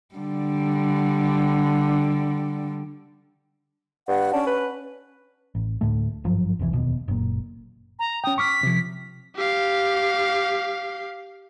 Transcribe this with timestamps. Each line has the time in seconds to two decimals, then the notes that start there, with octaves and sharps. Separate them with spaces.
0.15 D3 G3
4.08 G2 F#5
4.33 C#4 D4
4.47 B4
5.55 A1
5.81 D2 A2 A3
6.24 G#1 G2 F3 F#3
6.59 F1 C2 G#2 E3
6.73 F1 D#2 B2
7.08 F#1 A#2
7.99 A#5
8.24 C#4 G5 D#6
8.38 C#6 D6 F6 B6
8.63 C3 F3
9.36 G4 F5